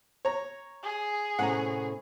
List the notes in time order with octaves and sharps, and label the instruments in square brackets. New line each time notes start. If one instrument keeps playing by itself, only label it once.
[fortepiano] C#5 A#5
[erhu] G#4
[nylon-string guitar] A2 C3 C#4 [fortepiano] F#5 A#5